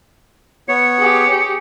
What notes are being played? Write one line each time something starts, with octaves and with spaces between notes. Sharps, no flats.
B3 C#5 C#7
G4 G#4